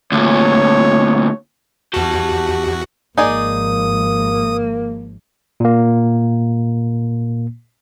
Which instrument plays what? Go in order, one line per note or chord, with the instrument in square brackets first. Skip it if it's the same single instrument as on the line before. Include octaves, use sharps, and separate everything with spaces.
[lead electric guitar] D2 A#2 [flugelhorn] C#5
[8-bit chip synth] E2 F#4 [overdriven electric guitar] G4 A5
[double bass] G#1 F3 [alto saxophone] A#3 [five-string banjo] D#4 G#4 D5 [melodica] D#6
[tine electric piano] A#2 A#3